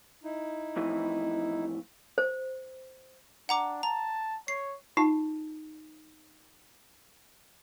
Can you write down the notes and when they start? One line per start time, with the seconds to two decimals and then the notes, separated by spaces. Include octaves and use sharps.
0.24 D#4 E4
0.76 F2 A2 E3
2.18 C5
3.49 D4 F#5 A#5 D6
3.83 A5 A#5
4.48 C#5 C7
4.97 D#4 F4 A5